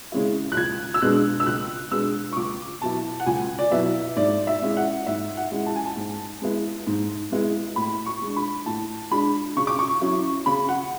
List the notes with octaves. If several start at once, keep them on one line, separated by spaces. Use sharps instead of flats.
C#3 G#3 C#4 E4
F#6
C#2 G#6
E6
B2 G#3 B3 D4 F#6
E6
C#2 F#6
B2 G#3 B3 D4 E6
C#6
C#2 D6
B2 F#3 B3 E4 A5
F#5
C#2 G#5
D5
B2 F#3 B3 E4 E5
G#2 D5
E5
G#3 C#4 E4
F#5
G#2 E5
F#5
G#3 C#4 E4
A5
G#5
A5
G#2
G#3 B3 E4
G#2
G#3 B3 E4
A2 B5
C#6
G#3 D4
B5
A2 A5
G#3 D4 B5
C#3 C#6
D6
C#6
F#3 C#4 E4
C#3 B5
F#5